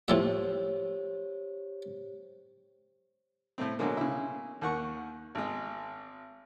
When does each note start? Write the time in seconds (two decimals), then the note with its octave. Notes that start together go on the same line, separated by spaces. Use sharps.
0.08 A2 F3 G4 C5 C#5 E5
3.58 A2 A3 C4
3.79 B2 D3 F#3 G#3 A#3
3.97 C#3 E4
4.62 D#2 D#3 F#5 C#6
5.35 G#1 G#3